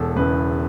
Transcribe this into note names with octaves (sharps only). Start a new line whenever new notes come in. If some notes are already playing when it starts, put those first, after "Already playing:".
Already playing: E1 A4
E2 C#3 B4